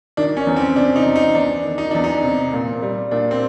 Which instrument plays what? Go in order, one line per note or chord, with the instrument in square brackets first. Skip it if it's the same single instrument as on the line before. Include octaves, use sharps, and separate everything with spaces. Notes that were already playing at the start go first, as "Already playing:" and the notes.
[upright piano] D#3 [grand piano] D4
[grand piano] C#4
[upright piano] E2
[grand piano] C4
[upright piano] C3 [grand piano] D4
[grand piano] D#4
[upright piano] E2
[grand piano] D#4
[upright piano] E2 [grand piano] D4
[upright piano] D#3
[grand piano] D#4
[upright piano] E2 [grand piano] D4
[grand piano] D#4
[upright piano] C3
A#2
G3
[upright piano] A#2 [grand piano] D4
[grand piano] C4